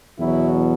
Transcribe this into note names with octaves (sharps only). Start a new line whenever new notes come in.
E2 B2 F#3 E4